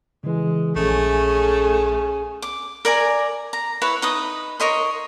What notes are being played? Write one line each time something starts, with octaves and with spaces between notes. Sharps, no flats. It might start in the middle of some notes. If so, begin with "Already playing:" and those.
C#3 E3 G#3
A#1 A3 C#4 G#4
D6
A#4 D5 G#5 A#5
A#5
E4 B4 C#5
D#4 B4 D#6
A#4 C#5 D#5 C6